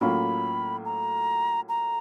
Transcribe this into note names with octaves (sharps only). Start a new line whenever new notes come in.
A2 F#3 A#3 C#4 F4 B5
A#5
A#5